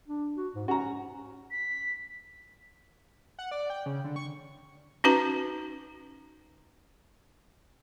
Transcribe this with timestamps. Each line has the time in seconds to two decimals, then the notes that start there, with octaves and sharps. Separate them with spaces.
0.08 D4
0.36 F#4
0.55 G#2
0.68 C#4 F#4 A#5
1.51 B6
3.39 F#5
3.51 D5
3.70 G5
3.86 C#3
4.04 D3
4.16 C#6
5.04 C#4 D#4 F#4 B4 A#5